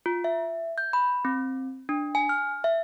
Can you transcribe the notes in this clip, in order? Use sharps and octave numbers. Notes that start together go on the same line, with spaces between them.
F4
E5
G6
B5
C4
D4
G#5
F6
E5